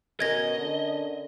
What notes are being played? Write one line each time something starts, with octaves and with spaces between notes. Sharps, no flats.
B2 C#4 A#4 D#5 G#6 A#6
D3